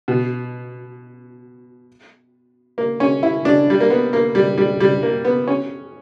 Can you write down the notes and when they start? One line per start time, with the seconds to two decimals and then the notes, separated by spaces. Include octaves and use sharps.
0.08 B2
2.78 A#3
3.00 C#4
3.23 E4
3.45 D4
3.70 G3
3.80 A#3
3.90 B3
4.13 A#3
4.35 G3
4.58 G3
4.80 G3
5.03 A#3
5.25 B3
5.48 C#4